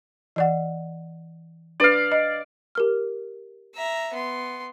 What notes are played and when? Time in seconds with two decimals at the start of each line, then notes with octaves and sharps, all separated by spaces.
0.36 E3 D5 F#5
1.80 D4 B4 D5 F5
2.12 D#5
2.75 G4 A#4 F6
3.74 E5 A#5
4.13 B3 C6